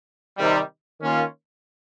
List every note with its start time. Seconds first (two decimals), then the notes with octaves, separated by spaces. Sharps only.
0.37 C3 D#3 G3
1.01 D#3 A#3 C#4 F4